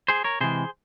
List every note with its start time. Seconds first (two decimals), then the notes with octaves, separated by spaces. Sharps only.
0.08 G#4 C5
0.24 A#4 C#5
0.41 C3 E3 G#3 G#4 C5